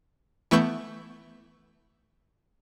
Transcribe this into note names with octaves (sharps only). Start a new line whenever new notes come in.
E3 A3 B3 C#6 G6